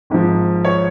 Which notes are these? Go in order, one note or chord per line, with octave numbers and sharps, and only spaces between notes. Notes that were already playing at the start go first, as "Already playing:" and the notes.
G#1 G#2 F3
C#5